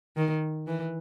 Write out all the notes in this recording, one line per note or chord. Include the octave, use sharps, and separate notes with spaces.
D#3
E3